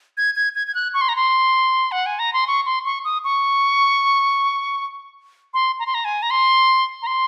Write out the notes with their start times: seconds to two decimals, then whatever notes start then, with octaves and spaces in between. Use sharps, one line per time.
0.17 G#6
0.36 G#6
0.55 G#6
0.67 G#6
0.75 F#6
0.94 C#6
1.01 C6
1.09 A#5
1.16 C6
1.92 F#5
2.06 G#5
2.19 A#5
2.33 C6
2.47 C#6
2.66 C6
2.85 C#6
3.04 D#6
3.24 C#6
5.54 C6
5.79 A#5
5.86 C6
5.94 A#5
6.05 G#5
6.22 A#5
6.30 C6
7.02 A#5
7.07 C6